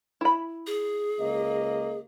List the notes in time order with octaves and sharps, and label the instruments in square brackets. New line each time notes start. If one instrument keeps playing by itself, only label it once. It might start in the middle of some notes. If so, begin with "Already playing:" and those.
[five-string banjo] E4 B5
[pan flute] G#4
[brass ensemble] C#2 A#3 D#5